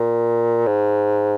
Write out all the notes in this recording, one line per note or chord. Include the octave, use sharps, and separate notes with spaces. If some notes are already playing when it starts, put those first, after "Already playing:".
Already playing: A#2
G#2